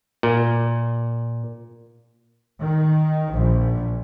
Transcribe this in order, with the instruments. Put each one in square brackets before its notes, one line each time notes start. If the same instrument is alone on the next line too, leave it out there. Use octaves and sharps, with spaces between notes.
[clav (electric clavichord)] A#2
[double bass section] D#3
A#1